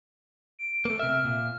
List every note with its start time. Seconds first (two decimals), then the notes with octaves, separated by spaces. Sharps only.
0.59 D7
0.85 A3 A#3
0.99 C3 E5 F6
1.25 A#2